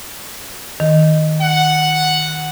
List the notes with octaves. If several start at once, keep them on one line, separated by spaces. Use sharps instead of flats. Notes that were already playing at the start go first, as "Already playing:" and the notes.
D#3
F#5